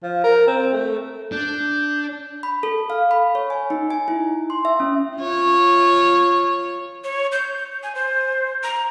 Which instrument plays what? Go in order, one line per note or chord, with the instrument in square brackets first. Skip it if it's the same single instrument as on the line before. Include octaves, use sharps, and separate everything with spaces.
[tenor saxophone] F3
A#4
C4
A3
[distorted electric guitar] D4 [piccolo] G6
[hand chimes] B5
A4
F5
B5
C#5
G#5
D#4
G#5
E4
C6
E5
C#4
[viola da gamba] F4 C#5
[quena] C#5
G6
G#5
C5
A#5